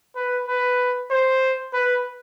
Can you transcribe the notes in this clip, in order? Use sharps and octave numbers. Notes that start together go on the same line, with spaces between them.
B4
B4
C5
B4